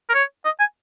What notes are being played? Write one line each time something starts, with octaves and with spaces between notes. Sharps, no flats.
A#4
C#5
D#5
G#5